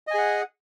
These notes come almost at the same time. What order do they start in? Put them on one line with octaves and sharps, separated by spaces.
D#5 G#5 G#4 F#5